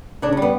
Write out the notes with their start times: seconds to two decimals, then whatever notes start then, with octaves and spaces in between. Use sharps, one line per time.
0.22 C#3 D4
0.32 C#4
0.37 G3 B3